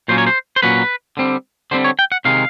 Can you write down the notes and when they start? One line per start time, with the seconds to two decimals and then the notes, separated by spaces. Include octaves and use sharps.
0.08 A#2 F#3 A#3 C#4 C5
0.18 C#5
0.27 C5
0.56 C5
0.63 A#2 F#3 A#3 C#4 B4
1.17 D3 G3 C4
1.71 D3 G3 C4 C5
1.84 C#5
1.99 G5
2.12 F#5
2.25 C3 D#3 G#3 F5